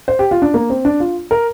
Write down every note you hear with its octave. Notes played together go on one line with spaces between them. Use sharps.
C5
G4
F4
D4
A#3
C4
D4
F4
A#4